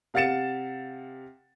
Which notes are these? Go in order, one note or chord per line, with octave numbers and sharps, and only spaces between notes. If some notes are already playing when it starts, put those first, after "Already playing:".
C3 F5 F#5 A6 C#7 E7